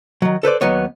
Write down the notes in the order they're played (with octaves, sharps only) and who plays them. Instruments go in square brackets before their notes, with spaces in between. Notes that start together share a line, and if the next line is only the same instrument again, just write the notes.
[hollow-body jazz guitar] D#3 F#3
A4 B4 C5 D5
D#2 F#3 B3 C#5